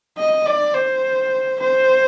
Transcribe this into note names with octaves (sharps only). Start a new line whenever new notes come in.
D#5
D5
C5
C5